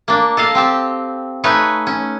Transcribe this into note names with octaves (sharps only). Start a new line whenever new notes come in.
A#3 D4
A4 D#5 F5 A5
C4 G4 A5
A3 D#4 B4 C#5 G#5
C#4